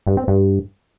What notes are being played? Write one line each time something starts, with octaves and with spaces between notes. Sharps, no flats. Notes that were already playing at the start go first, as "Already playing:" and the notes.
G2
C4
G2